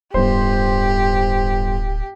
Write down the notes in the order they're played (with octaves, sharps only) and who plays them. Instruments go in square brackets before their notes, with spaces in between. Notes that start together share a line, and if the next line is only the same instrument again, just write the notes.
[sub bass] D1 [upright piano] G1 C5 [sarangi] G4